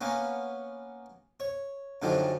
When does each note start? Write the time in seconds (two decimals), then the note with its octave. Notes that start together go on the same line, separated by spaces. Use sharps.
0.01 A#3 B3 C#4
1.40 C#5
2.02 F#2 D3 D#3 F3 G3